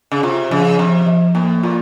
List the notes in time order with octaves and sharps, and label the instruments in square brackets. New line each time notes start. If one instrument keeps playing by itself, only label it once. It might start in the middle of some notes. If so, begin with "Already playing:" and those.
[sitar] C#3
[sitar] C3 [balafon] F4
[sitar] C#3 [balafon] F3
[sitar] C3 [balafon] F3
[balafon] F3
[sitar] A2 [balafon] A#3
[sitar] A#2 [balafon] F4